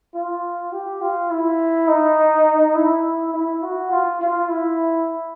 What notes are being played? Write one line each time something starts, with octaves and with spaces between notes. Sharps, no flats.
F4
G4
F4
E4
D#4
E4
E4
F#4
F4
F4
E4